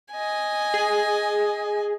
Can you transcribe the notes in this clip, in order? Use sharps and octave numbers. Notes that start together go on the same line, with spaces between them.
D#5 G#5
G#4